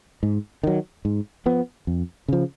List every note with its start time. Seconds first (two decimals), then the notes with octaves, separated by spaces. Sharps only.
0.23 G#2
0.63 D#3 F#3
1.05 G#2
1.46 F3 B3
1.87 F2
2.28 C#3 F3